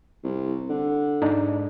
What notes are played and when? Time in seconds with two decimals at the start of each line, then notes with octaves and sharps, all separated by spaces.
0.24 C2
0.70 D3
1.22 G#2 D4 D#4